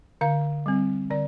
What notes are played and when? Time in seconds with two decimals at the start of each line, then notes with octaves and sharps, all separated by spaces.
0.21 D3 F5
0.66 G3 C4
1.10 D3 D5